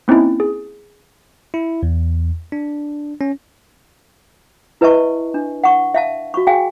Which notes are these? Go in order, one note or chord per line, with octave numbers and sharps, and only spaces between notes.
A#3 C4 C#4 D#4 E4
G#4
E4
E2
D4
C#4
E4 B4 D#5 E5 A5 C#6
D4
F#5 C#6
E5 F5 A5
F#4 C#6
G#4 F5 G5 G#5